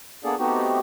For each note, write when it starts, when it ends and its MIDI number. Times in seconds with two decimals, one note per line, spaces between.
0.24 0.35 58
0.24 0.35 59
0.24 0.35 62
0.24 0.35 68
0.24 0.35 69
0.24 0.35 74
0.39 0.79 57
0.39 0.79 59
0.39 0.79 60
0.39 0.79 63
0.39 0.79 66
0.39 0.79 67